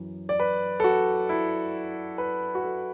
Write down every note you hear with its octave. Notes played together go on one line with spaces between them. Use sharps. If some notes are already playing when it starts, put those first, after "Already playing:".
Already playing: F#2 E3
D5
B4
A4
F#4
E4
B4
F#4
A4